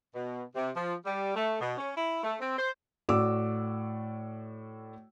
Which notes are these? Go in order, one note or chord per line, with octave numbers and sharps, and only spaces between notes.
B2
C3
F3
G3
A3
B2
C#4
E4
A3
C4
C5
A2 F#4 D5 D6 E6